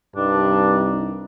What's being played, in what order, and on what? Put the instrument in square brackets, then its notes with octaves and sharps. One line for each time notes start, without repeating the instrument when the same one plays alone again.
[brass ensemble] C2 D#4 [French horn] G2 [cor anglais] D4